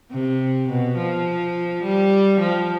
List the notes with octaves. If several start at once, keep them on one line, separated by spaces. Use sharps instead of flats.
C3
B2
F3
G3
F3